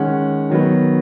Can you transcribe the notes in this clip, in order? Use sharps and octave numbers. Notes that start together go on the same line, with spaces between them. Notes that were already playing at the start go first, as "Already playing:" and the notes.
Already playing: D#3 G#3 C#4 F#5
D#3 F#3 B3